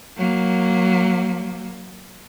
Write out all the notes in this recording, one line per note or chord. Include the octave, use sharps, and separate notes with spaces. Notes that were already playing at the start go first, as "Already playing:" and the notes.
F#3 A#3